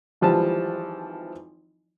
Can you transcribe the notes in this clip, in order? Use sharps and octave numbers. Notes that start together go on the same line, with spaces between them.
G#1 E3 F3 G3 A5